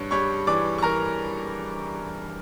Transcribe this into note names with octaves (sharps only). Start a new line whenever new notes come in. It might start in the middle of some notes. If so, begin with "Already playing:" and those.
Already playing: G2 C#5 C#6
G3 C#5 C#6
E3 D5 D6
C#6
E3 A#4 A#5